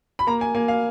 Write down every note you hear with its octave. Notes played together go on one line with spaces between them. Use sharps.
B5
A#3 A#5
G#5
A#3 G#5
F5